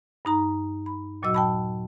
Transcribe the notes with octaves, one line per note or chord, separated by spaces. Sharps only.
G2 D#4 A#5
B5
D#2 A#2 F#3 F#4 D#5 E6
G5 A5 B5